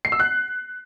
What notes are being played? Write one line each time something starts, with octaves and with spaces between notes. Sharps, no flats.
C7
E6
F#6